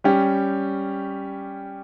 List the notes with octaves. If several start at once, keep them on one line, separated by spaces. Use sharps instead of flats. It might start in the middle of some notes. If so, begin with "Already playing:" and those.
G3 C#4 G4